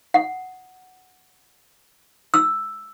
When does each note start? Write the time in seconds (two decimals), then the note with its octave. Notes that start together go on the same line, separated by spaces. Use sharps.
0.14 F#5
2.34 E6